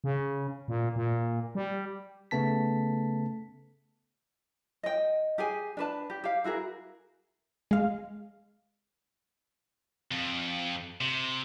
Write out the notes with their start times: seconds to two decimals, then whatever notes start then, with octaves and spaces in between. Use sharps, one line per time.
0.04 C#3
0.68 A#2
0.96 A#2
1.55 G3
2.31 C#3 A3 B3 A5 B6
4.83 D#5 G5
5.38 G4 G#4 G#5
5.77 D4 B4 A5
6.10 G4
6.24 G4 F5
6.44 E4 F#4 G#4 A#4
7.71 G#3 F5
10.11 F2
11.01 C3